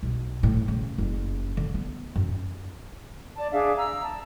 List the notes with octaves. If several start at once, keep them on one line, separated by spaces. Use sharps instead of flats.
B1
A2
C#3
F#1
D3
B3
F#2
D5 A5
D4 G#4 E5 F5
A#5 E6
A5